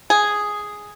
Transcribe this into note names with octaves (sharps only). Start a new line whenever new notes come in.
G#4